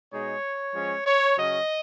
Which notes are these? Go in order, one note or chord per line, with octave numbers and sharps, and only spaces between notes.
B2 G#3 D#4 C#5
F3 G#3 C#4
C#5
C#3 F#3 C#4 D#5